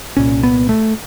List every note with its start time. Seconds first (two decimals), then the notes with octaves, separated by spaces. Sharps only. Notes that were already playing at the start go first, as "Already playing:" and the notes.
0.17 C2 A#2 C#4
0.43 B3
0.69 A3